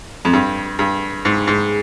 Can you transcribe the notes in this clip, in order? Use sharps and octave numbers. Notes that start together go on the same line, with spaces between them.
F2
G2
G2
G#2
G#2